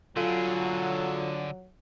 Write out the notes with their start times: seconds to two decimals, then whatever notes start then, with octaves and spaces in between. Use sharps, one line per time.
0.16 D3 F#3 F4 G#4 A4 F5